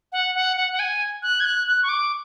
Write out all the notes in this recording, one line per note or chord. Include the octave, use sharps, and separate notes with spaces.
F#5
F#5
F#5
F#5
G#5
F#6
G#6
F#6
F#6
C#6
D6